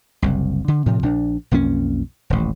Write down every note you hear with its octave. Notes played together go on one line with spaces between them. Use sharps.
F#1 C2
D3
A2 C3 F3
A#1 D4
B1 F2 A#3 C#4
D#1 A1